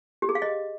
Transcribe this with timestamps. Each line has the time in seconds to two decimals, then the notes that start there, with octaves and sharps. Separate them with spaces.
0.22 G4
0.29 G#4
0.35 F5
0.42 D#5